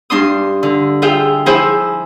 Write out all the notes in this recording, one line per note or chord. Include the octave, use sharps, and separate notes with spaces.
G2 D4 C6 D#6
D3
F4 G#4 E5 F5 G5
F3 E4 G#4 C5 G#5 E6